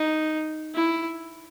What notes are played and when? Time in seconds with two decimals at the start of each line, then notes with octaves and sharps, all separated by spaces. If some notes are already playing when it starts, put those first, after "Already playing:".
Already playing: D#4
0.75 E4